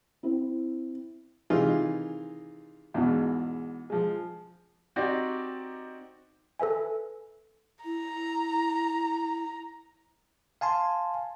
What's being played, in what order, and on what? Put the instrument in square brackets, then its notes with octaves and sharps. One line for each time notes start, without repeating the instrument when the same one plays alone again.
[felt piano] C4 E4
[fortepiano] C3 D#3 E3 D#4 F4 G#4
E2 G#2 B2
F3 G#3
[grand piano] C4 D#4 F#4 G4 D5
[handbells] A4 B4 E5 G#5
[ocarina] E4 [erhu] A#5
[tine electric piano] F5 G#5 A5 C6